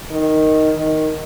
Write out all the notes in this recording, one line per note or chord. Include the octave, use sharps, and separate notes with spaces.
D#3
D#3